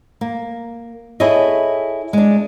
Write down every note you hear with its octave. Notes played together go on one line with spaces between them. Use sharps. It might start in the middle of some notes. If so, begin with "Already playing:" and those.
A#3
E4 G#4 A4 C#5 D#5
G#3 D4